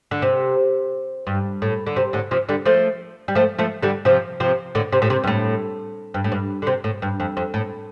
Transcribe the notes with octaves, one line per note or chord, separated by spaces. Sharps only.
D3
C3
G2
A2
D3
C3
A2 D3
C3 F3
D3 G3
F3 A3
G3
F3 A3
F3 A3
D3 G3
C3 F3
C3 F3
A2 D3
C3
A2
C3
G2
A2
G2
A2
G2
D3
C3
A2
G2
F2
F2
A2